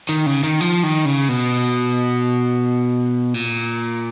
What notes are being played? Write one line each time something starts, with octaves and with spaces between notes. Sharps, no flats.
D#3
C#3
D#3
F3
D#3
C#3
B2
A#2